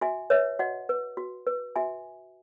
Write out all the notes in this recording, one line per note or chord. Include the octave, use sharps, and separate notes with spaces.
F#4 E5 G#5
B4 C#5 E5
F#4 D#5 F#5
B4
F#4
B4
F#4 E5 G#5